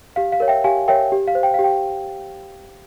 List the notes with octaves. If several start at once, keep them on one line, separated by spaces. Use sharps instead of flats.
G4 F5
F5
A#4 C#5
E5 G5
G4 F5 G#5
A#4 C#5 E5 G5
G4
F5
C5
G5
G4 F5
G5